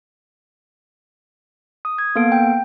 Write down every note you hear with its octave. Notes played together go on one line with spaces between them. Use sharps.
D#6
G#6
A#3 B3 A4 F5 D7
G5